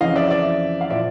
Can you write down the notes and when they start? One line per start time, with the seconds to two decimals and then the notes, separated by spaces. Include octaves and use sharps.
0.01 F2 C#3 E3 D#5 F5
0.16 D5 E5
0.30 D5 E5
0.81 F5
0.90 A#2 F3 D5 E5